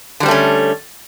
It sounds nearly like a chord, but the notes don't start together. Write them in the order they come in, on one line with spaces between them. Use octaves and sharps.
D3 G3 C4 A3 C#4